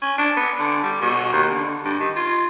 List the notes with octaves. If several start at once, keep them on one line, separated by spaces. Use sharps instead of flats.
C#4
D4
B3
D3
G3
B2
D#2
D3
G2
D#3
F4